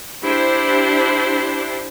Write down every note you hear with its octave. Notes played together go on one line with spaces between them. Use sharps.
D4 E4 G4 C5